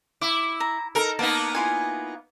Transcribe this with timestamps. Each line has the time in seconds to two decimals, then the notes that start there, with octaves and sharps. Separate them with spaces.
0.21 E4 D6
0.60 A#5
0.95 D#4 A4 A#4
1.19 A#3 B3 D#4 A5
1.55 E4 F4 G#5